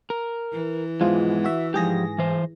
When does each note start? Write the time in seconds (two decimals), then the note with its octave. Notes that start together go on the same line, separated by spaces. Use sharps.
0.10 A#4
0.52 E3
1.01 E2 G#2 F3 G#3 F4
1.44 F#4 E5
1.74 G#2 F3 G4 G#4 A#6
2.18 E3 C5